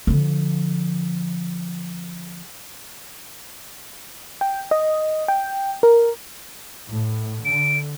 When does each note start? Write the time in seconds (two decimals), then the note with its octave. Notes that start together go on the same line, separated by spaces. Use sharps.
0.07 D3 F3
4.41 G5
4.71 D#5
5.28 G5
5.83 A#4
6.91 A2
7.45 D3 D7